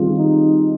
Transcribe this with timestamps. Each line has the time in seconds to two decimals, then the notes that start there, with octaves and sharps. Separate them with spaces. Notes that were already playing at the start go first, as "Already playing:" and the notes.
Already playing: D#3 G3 C4 F4 G#4
0.18 D#4